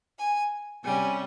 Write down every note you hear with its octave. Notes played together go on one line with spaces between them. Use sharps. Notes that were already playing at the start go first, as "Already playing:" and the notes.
G#5
C3 G3 C#4 G#5